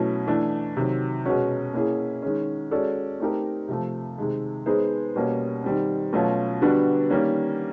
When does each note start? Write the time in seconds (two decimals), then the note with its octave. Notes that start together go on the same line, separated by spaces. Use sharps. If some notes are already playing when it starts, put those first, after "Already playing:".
Already playing: B2 F#3 A3 C#4 E4
0.27 E3 A3 D4
0.77 C3 D#3 F#3
1.26 B2 G#3 C#4 F#4
1.74 A#3 C#4 E4 G#4
2.22 D#3 G#3 C#4
2.71 G#3 C#4 F#4 A4 D5
3.20 A3 C4 D#4 G4 A#4
3.68 C3 F3 A3
4.18 C3 D#3 G#3
4.66 G#3 B3 D#4 G#4 C5
5.16 B2 G3 A#3 C#4
5.64 D#3 G3 C4
6.13 B2 F#3 A3 C#4 F4
6.61 D3 G3 B3 D4 F#4
7.10 D#3 G3 A#3 C#4